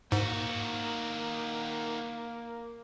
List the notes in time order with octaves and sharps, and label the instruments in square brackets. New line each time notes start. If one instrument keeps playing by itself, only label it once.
[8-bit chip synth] G#2 [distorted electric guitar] D#3 F#4 [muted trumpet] A#3